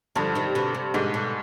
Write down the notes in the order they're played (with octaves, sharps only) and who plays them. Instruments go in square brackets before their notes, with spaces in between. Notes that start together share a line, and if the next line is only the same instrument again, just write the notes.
[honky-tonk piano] G2 [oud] D3 F3
[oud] C3 D#3
B2 D3
C3
[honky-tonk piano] G#2 [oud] B2 D3
[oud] B2 D3